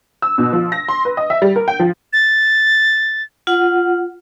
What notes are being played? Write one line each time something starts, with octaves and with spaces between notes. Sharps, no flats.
E6
B2
F3
A#6
C6
B4
D#5
E5
G3
A#4
G5
F3
A6
F4 F#5